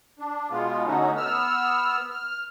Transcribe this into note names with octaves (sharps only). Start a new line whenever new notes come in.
D4
B2 G#3 B3 F4
D3 A3 C#4 D#4 F#4
B3 E6 F6
F6